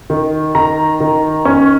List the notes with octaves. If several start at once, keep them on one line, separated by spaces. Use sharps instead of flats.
D#3
D#3 A#5
D#3
C#4